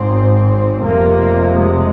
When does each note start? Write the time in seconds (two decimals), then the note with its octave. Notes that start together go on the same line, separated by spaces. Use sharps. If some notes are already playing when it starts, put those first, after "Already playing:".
Already playing: G#1 G#2 C4
0.82 F1 F2 C3 A#3
1.55 G#3